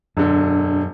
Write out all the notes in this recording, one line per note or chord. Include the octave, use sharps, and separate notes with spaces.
E1 F#2 D3